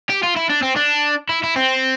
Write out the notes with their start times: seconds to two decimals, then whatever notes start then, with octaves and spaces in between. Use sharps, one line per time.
0.10 G4
0.24 F4
0.37 E4
0.50 D4
0.63 C4
0.76 D4
1.29 E4
1.44 E4
1.56 C4